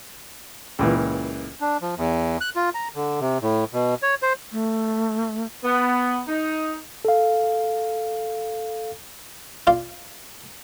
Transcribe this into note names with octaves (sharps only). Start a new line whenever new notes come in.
C#2 A#2 E3
D4
F3
E2
F#6
F4
A#5
D3
C3
A2
B2
C#5
C5
A3
B3
D#4
A4 F5
F4 D5 F5